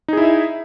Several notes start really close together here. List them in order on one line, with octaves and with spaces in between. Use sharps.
D#4 G#4 E4 E5